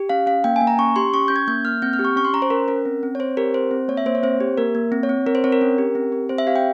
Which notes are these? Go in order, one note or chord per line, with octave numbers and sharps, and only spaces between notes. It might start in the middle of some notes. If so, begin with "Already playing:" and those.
Already playing: G4
C#4 F5
C#4 F5
A#3 G5
G#5
A#3
A#5
C#4 C#6
G4 C6
C#4 C#6
C#4 G6
G#6
A#3 G6
A#3 F6
C4 G6
F6
G4
C#6
C#4 C#6
C6
C#4 A#5
C5
C#4 A#4
C#4 A#4
C4
C4
C#5
C4 C5
G4 A#4
C4 C5
C4
A#3 C#5
E5
A#3 C5
C#5
C4 C5
G4
A#3 A#4
A#3
C4
C#5
C4
C4 A#4
C5
C4 C#5
A#4
C#4
G4
C4
G4
C4 C5
E5
G4 F5
G5